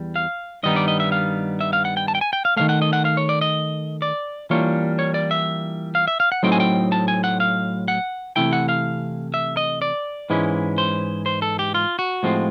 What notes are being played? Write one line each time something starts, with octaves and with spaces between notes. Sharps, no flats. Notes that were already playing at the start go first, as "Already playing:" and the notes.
Already playing: E2 G3
F5
G2 D#3 G3 B3 D#4 D#5
D5
D#5
E5
F5
E5
F5
F#5
G5
A5
G5
G#5
G5
F5
D#3 F#3 A3 F5
F#5
D#5
F#5
F5
C#5
D5
D#5
D5
E3 G3 A#3 D4 F4 C#5
C#5
D5
E5
F5
E5
F5
F#5
A2 F#3 A3 C4 D#4 G5
G#5
G5
A5
G#5
F#5
F5
F#5
C3 E3 A3 E4 G5
F#5
F5
E5
D#5
D5
G#2 E3 G#3 C#4 E4
C5
C5
A4
G4
F4
F#4
A2 F3 G#3 C4 F4